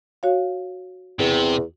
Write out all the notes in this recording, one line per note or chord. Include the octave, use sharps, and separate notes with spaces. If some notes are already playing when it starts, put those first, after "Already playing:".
F#4 C#5 F5
E2 C3